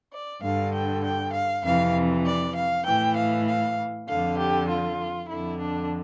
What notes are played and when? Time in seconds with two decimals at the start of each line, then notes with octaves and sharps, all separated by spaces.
0.12 D5
0.42 G2 D3 F5
0.73 G5
1.04 G5
1.33 F5
1.63 F2 C3 E3 F5
2.25 D5
2.55 F5
2.85 A2 E3 G5
3.16 F5
3.47 F5
4.08 F2 D3 F5
4.38 G4
4.69 F4
5.29 F2 D3 E4
5.59 D4